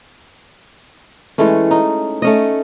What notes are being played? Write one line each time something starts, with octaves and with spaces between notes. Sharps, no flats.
E3 G#3 A3 C#4
D#4
A3 C#4 D#5